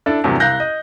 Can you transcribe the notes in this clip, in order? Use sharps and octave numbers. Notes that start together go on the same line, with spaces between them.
D4 E4 A4
E2 G2 C3 F#3 A3 D4
C2 F5 F#6 G6 A#6
D#5